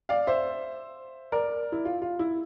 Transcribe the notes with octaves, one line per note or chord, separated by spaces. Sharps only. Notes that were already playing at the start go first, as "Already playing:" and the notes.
D5 F5
C5 E5
A#4 D5
E4
F4
F4
E4